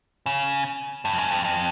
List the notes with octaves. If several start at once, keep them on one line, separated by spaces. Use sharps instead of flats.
C#3
G2
F2
F#2
F2
F2